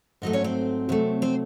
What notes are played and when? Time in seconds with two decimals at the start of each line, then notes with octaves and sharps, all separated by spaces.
0.22 G#2 F#3 A3 D#4 D#5
0.33 C#4 C#5
0.44 C4 C5
0.89 C3 F#3 A3
1.22 C4 C5